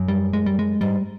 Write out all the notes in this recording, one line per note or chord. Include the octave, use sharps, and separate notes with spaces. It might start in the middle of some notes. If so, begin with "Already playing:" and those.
Already playing: F#2
G3
G#3
G3
G#3
G#2 G3